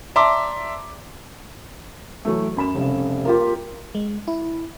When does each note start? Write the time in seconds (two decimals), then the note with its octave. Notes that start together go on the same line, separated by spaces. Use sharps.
0.16 D5 E5 A5 A#5 C6 D6
2.25 E3 F#3 A3
2.57 F#2 B5 E7
2.75 F1 C2 C#3
3.25 A#3 F4 G4
3.95 G#3
4.28 E4